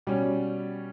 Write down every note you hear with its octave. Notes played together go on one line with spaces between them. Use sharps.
B2 G3 C#4